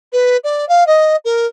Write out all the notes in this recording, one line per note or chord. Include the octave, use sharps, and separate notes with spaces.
B4
D5
F5
D#5
A#4